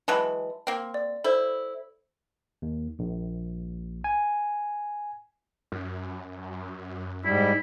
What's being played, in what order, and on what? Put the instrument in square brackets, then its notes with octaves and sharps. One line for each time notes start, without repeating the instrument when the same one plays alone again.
[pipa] E3 F#3 G#3 [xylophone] A5 B5
[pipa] A#3 C4
[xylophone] D5
[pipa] E4 [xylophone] A4 C5
[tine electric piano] D#2
A#1
G#5
[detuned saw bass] F#2
[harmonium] G#2 G3 [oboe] E4